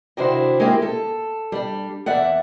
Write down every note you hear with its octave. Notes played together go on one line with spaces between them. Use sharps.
C3 D#3 D4 E4 F#4 C5
G#3 A#3 E4 G4
A4
G3 D4
E2 D5 E5 F#5